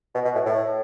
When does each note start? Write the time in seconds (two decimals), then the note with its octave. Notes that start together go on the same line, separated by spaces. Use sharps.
0.15 B2
0.25 B2
0.35 A2
0.45 A2